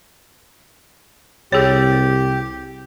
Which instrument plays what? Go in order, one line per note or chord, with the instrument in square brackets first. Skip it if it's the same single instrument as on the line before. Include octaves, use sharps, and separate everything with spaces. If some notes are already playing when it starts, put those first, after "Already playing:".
[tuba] C2 [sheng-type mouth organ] G4 [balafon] G#4 C#5